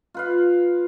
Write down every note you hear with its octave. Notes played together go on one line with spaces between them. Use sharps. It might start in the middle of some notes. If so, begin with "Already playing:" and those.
F4 B4 F5